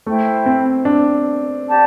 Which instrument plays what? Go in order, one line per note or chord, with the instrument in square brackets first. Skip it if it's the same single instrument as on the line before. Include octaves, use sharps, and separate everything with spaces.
[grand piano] A3 [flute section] E4 C5 G5
[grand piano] C4
D4
[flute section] G4 D5 A5